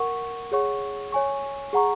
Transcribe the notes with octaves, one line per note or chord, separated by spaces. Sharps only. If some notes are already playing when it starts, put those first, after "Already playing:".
Already playing: A#4 F#5 C#6
G#4 C#5 F#5 C#6
C#5 G#5 C#6
G#4 F#5 A#5 C#6